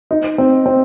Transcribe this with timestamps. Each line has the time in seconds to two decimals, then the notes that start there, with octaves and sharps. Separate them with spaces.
0.11 D#4
0.38 C4
0.66 C4